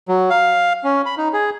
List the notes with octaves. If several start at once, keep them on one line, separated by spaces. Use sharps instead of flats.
F#3
F5
C#4
B5
D#4
G#4